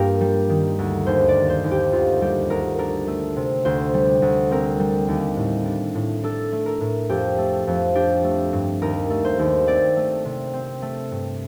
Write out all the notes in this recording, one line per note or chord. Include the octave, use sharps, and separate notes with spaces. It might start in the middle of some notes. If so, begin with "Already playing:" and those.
Already playing: G2 A#3 D4 F4 G4 A#4
G3
D#3
D2
D#2 C5
D5
A#3
C5
D#2
G4
D2 F4
G3 G4
D2 A#4
D4 A#4
A3
C3
D2 C5
G3
D2
C4 A#4
G3
D#2
A2
D4
A2
D4 A4
A3
A#4
A2
F2 G4
A3
F2
D4 G4
A3
G2
D#2 A#4
A3
C5
D#2
C4 D5
A3
C3
C4
A3
G2